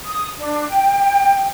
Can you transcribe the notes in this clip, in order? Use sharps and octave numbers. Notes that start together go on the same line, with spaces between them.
D#6
D4
G5